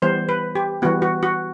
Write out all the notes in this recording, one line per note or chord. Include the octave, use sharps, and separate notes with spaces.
E3 G3 B3 C5
B4
G4
E3 G3 B3 F#4
F#4
F#4